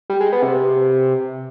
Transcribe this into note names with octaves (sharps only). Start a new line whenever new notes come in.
G3
G#3
B3
C3